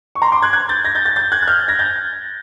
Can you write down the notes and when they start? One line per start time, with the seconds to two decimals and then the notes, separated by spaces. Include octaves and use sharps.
0.15 C#6
0.22 A#5 C6
0.32 C6 D6
0.42 F#6 G#6
0.53 F#6 G#6
0.69 G6 A6
0.85 G#6 A#6
0.95 G6 A6
1.05 G6 A6
1.16 G6 A6
1.32 F#6 G#6
1.43 F#6
1.48 F6 G6
1.68 G#6 A#6
1.79 G6 A6